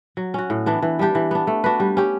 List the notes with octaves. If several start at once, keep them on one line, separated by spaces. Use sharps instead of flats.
F#3
C#4 F#4
A2
E3 B3 D4
E3
G3 D4 G4
E3
B3 D4
A3
D4 F#4 B4
G3
C#4 G4